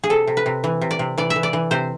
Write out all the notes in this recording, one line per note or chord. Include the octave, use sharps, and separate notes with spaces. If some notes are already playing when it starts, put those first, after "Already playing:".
G#4
C3 A4
C3
B4
C3
E3
C3
D5
C3
E3 D5
E5
E3
D5
E3
C3 C5